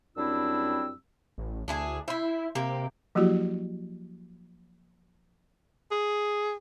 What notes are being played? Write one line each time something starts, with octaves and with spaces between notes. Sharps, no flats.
F#2 G3 C4 D4 E4 E6
A1
D2 D4 E4 G#4
E4 C5 E5
C3 A#3 G4
F3 F#3 A#3 E4 F#4 G4
G#4